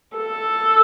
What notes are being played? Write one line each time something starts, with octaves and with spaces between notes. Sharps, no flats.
A4